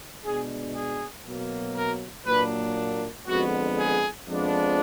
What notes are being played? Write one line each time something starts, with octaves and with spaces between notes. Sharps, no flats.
B2 G#3 D4 G#4
G#4
B2 F#3 A#3
A#4
A#2 F#3 A#3 D4 B4
F2 D3 G#3 B3 F#4
G#4
F2 F3 G#3 B3 D4